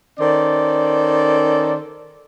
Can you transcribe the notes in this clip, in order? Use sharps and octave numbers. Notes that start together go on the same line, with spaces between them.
D#3 C#4 A4 C5 D5